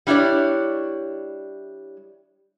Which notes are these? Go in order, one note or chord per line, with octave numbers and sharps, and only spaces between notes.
G3 D4 E4 C#5 D5